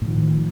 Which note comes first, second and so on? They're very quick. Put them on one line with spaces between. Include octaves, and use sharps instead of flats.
A2 D3 D#3 F3